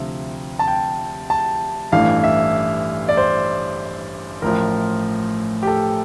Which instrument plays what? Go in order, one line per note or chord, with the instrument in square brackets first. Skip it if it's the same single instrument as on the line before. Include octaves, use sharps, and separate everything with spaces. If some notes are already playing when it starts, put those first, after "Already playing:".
Already playing: [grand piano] D2 C3 F3 E5
A5
G5
A5
A1 G2 E3 A3 F5
E5
D5
C5
A1 A2 F3 A#4
G4
A4